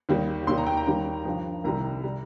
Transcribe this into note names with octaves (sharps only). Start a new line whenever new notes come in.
D#2 D#3 G3
D#2 D#3 G3 C6
A#5
G5
A#5
D#2 D#3 G3
G2 F3
C2 C3 D#3 G3 A#5
G3